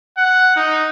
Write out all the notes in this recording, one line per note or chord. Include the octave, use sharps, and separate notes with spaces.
F#5
D#4